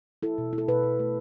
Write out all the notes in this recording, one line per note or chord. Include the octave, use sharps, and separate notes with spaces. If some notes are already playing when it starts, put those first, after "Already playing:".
E4 A4
B2
E4
A4
B2 B4
B2
A3